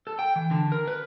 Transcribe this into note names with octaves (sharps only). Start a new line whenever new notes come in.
A4
G5
E3
D3
A#4
B4